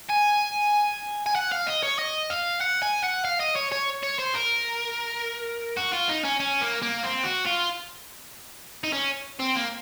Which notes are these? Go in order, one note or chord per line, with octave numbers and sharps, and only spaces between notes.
G#5
G#5
F#5
F5
D#5
C#5
D#5
F5
F#5
G#5
F#5
F5
D#5
C#5
C#5
C#5
C5
A#4
F#4
F4
D#4
C#4
C#4
A#3
A#3
C4
F#4
F4
D#4
C#4
C4
A#3